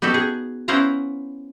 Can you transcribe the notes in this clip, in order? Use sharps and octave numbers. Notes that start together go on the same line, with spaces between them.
B3 D#4 F#4 G4 A4
G#4
B3 C#4 E4 C5 F5 A#5